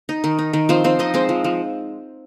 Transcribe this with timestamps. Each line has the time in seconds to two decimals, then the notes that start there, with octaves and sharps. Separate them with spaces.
0.09 D#4
0.24 D#3
0.39 D#4
0.53 D#3
0.69 F3 C4 C5
0.84 F3 C4 C5
0.99 C4 D#4 D#5
1.14 G#3 C4 C5
1.29 F3
1.44 F3